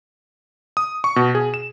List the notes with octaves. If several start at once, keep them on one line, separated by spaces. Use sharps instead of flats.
D#6
C#6
B2
G#4
E7